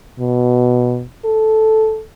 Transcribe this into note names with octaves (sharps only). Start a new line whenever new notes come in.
B2
A4